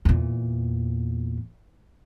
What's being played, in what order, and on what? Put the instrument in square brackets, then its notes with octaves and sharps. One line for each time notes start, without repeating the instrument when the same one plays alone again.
[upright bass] E2 A#2